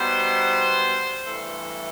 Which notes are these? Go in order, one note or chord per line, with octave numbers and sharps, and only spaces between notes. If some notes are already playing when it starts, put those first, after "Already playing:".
Already playing: B2 G3 B3 D#4 C5
G2 E3 A3 A4